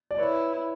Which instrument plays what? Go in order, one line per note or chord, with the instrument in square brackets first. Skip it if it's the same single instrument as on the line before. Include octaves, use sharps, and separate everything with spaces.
[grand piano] D5
[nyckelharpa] E4 [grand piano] B4 C#5